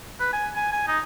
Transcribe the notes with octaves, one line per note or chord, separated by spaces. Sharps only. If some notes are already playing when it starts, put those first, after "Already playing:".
B4
G#5
G#5
G#5
D#4